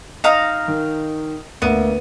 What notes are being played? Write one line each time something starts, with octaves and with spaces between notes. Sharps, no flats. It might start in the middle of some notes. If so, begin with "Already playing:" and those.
D#4 F5 A#5
D#3
D2 A#3 B3 D#7